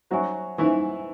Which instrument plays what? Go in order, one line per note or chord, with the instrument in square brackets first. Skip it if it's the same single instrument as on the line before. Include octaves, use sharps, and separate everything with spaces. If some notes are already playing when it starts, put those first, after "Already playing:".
[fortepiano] F#3 F#4 [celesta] C5 E5 G#5 C#6
[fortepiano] E3 E4 [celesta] C5 E5 G#5 C#6